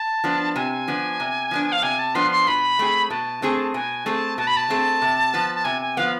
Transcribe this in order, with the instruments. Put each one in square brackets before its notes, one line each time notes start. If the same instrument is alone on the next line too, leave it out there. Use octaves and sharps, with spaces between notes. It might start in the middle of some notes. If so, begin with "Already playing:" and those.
Already playing: [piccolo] A5
[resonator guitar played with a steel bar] F3 B3 D4
[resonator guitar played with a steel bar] C3 [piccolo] G#5
[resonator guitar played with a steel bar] F3 B3 D4
C3
F3 B3 D4
[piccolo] F5
[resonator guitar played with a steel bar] C3 [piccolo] G#5
[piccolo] A5
[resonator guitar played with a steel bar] F3 B3 D4 [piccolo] C6
[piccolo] C6
[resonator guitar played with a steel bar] B2 [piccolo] B5
[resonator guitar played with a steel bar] A3 C4 G#4
[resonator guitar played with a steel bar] B2 [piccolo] A5
[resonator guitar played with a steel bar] A3 C4 G#4
[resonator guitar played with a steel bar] B2 [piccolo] G#5
[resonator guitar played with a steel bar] A3 C4 G#4 [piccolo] A5
[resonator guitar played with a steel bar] B2 [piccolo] A5
[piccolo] B5
A5
[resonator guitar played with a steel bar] A3 C4 G#4
C3
F3 B3
[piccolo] A5
[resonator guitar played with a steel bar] C3 [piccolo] G#5
[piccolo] G#5
[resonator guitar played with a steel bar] F3 B3 [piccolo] F5